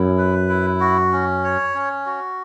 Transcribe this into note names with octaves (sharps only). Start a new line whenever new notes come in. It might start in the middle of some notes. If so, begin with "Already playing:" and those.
Already playing: F#2 E4
B4
E4
F#4
C#4
C#5
C#4
F#4